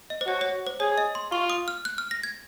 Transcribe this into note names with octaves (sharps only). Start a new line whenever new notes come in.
D#5
C5
F#4 C#5
C#5
C5
G#4 C#5
D#5
C6
F4 C#6
D#6
F6
F#6
F6
A#6
G#6